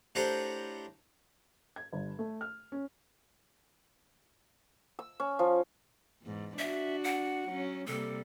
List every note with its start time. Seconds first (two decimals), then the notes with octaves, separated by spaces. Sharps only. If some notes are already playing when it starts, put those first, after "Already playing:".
0.15 A2 D4 G4 C5 F#5 A#5
1.76 G#6
1.93 G1
2.19 A3
2.41 F6
2.72 C#4
4.99 E6
5.20 C#4
5.39 F3
6.23 E2 G#2
6.58 D4 F#4 E5
7.04 F#5
7.48 F#3 C#4
7.87 C3 G3 A#3 A4